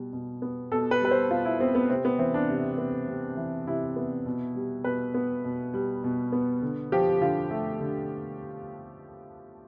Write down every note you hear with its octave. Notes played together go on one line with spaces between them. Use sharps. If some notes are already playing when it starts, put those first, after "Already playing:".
Already playing: B2 G3
B2
B3
B2 A4
B4
G3 B4
C5
B2 F4
E4
B3 C4
B3
C3 C4
B3
E3 C4
D4
C3
B3
C3
E3
C3 E4
B3
B2
G3
B2 B4
B3
B2
G3
B2
B3
D3
F3 G4
D3 F4
A3
D3